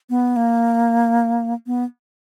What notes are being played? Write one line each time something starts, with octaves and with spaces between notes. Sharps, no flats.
B3
A#3
B3